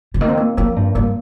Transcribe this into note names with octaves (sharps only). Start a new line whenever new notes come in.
D3
D#3 A#3
C4
A#3
F3 A#3
G2
G2 A#3